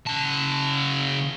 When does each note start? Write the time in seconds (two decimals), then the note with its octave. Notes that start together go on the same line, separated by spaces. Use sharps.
0.07 C#3 A5